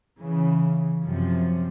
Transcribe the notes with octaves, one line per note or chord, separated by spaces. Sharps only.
C#3 E3
F#2 C3 F3